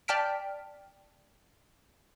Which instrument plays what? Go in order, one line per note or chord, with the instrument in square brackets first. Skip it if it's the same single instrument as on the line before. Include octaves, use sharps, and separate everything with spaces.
[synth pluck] D5 G5 A5 F6 B6 D7